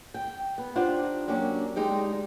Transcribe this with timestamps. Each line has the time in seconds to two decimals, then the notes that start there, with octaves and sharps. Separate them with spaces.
0.14 G5
0.58 B3
0.76 D4 D#4 F4 G4 C5 F#5
1.27 F#3 A#3 C#4 D4 G4
1.76 D2 G#3 D#4 G4 D5